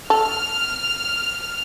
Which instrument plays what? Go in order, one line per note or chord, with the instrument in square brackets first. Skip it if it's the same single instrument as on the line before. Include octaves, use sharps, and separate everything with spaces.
[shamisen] A4 [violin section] F6